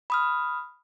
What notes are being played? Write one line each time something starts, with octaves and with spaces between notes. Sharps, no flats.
B5 D#6 F6